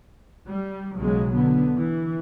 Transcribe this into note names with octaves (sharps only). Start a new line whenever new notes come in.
G3
B1 C#3 F#3 G#3
D3 B3
E3